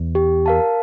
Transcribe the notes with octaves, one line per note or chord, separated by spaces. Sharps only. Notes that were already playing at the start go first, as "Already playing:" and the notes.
Already playing: E2
G4
A#4 F5 A5